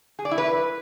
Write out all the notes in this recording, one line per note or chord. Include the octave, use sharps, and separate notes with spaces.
G#4
D5
E4
B4